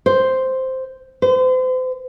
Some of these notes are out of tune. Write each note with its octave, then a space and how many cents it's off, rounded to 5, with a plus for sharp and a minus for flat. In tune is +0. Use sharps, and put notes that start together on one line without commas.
C5 +0
C5 -40